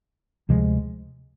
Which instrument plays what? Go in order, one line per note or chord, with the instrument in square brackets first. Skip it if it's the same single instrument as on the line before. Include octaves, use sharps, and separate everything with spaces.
[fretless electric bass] D2 C3 F3 G#3